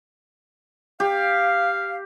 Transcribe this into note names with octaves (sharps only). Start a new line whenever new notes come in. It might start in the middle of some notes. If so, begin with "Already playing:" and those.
G4 F5